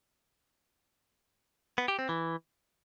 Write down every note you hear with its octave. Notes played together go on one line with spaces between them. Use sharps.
B3
G4
C4
E3